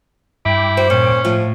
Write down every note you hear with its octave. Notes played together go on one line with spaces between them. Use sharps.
G2 E4 G5 D6
F#4 C5
A#2 C#4
A2 F3